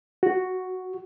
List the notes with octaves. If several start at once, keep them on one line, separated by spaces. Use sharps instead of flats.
F#4